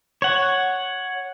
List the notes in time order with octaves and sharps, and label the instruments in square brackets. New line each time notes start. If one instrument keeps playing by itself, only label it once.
[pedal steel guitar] C#5 F#5